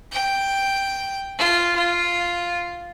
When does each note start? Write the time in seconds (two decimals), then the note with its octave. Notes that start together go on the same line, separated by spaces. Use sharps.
0.12 G5
1.38 F4
1.75 F4